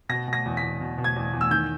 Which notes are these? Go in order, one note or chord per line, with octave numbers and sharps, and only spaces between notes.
B2 A#6
B2
A#6
E2
B6
E2
B2
B2
G#6
E2
E2
E6
D#3 G6